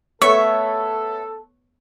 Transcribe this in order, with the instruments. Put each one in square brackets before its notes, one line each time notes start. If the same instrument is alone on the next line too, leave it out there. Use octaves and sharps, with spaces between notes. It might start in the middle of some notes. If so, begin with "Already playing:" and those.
[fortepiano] A3 B3 C#5 [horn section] A4 [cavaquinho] E5 [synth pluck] C#6